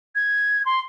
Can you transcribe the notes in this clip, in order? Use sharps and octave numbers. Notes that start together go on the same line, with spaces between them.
G#6
C6